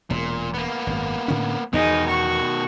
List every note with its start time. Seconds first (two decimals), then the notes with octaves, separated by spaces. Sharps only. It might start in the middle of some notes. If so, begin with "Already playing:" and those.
0.10 E1 A#2
0.54 A#3 B3
0.87 G#1 F#2
1.28 A2 D3 C#4
1.73 E2 B2 D#3 G#3 B3 D#4
2.08 F#4 C#6